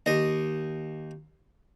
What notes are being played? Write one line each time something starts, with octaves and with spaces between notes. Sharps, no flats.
D#2 D#5